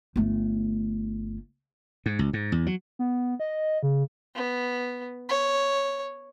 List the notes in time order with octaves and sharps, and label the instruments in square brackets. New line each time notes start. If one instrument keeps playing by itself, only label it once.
[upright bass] G1 A3
[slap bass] G#2
C#2
G#2
E2
F#3
[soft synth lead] B3
D#5
C#3
[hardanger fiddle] B3
C#5